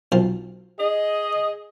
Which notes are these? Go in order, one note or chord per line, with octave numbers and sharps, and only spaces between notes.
B1 F3
G#4 D#5